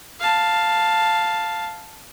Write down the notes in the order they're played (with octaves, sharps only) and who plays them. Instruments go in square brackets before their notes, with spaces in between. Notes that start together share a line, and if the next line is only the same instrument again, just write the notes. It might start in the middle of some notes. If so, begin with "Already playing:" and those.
[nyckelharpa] F5 A5